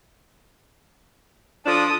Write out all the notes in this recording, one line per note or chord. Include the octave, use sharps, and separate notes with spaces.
F3 D4 A4 D#6